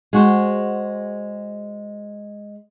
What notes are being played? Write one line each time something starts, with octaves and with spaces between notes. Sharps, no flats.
G#3 F#4 C5